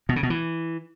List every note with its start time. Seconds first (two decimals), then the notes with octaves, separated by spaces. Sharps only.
0.09 B2
0.16 C#3
0.23 B2
0.30 E3